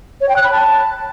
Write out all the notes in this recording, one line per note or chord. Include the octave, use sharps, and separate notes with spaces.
C#5
G5
F#6
B5
A5